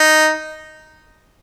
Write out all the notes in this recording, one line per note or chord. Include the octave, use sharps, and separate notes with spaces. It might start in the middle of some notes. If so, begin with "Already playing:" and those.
Already playing: D#4